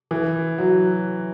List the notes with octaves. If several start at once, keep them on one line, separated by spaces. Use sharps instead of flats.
E3
F#3